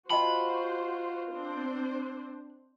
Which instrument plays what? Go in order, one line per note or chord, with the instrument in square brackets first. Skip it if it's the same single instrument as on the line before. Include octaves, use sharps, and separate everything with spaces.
[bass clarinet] F4 [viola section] F#4 C5 [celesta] D#5 G5 A5 [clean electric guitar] B5
[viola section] C4 D4 C5